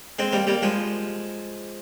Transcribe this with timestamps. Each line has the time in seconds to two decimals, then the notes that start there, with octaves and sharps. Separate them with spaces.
0.19 G#3 C4
0.32 G3 A#3
0.47 G3 A#3
0.62 F3 G#3